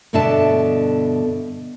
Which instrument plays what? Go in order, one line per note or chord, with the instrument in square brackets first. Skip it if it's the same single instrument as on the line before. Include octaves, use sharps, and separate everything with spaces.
[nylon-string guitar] G2 B2 D3 D4 E5 A5